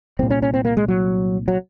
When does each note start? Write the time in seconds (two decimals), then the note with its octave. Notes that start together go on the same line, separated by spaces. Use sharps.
0.19 C2 C4
0.23 A#2
0.30 C#4
0.42 C#4
0.54 C4
0.65 A#3
0.77 G#3
0.88 F#3
1.48 F#3